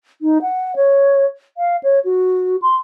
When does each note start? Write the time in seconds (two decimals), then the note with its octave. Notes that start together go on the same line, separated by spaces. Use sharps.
0.22 D#4
0.42 F#5
0.76 C#5
1.58 F5
1.83 C#5
2.05 F#4
2.62 C6